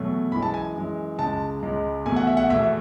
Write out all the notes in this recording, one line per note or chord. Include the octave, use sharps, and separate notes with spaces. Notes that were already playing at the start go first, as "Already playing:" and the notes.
Already playing: E2 B2 F#3 A3
F#2 E3 G#3 B5
A5
G#5
F#2 E3 G#3
C#2 C#3 G#3 A5
C#2 C#3 G#3
E2 B2 A3 G#5
F#5
E5
F#5
E2 B2 A3 E5